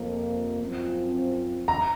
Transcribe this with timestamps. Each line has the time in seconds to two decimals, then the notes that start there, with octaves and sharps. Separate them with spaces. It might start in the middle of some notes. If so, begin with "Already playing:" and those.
Already playing: F2 C3 F3 A#3
0.61 F#2 F3 C4 F4
1.68 A#5